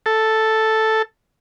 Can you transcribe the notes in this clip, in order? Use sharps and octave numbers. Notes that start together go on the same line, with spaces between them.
A4